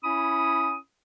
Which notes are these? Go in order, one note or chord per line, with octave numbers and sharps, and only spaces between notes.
C#4 E4 B5 D#6